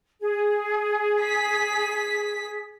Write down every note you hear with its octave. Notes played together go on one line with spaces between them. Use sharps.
G#4
B6